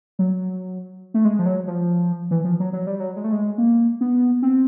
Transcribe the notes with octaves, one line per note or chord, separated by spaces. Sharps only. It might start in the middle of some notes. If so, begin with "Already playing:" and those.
F#3
A3
G#3
F3
F#3
F3
E3
F3
F#3
F#3
G3
F#3
G#3
A3
G#3
A#3
B3
C4